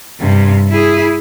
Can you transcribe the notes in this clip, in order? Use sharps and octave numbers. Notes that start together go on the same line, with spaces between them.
G2 C3
E4 G#4